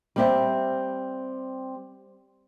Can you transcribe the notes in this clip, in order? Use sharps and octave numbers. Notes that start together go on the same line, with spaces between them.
G3 C4 E5